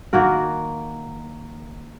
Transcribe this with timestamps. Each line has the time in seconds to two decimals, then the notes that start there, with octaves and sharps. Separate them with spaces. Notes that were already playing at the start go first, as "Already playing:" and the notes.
0.13 D#3 A#3 F#4 A#4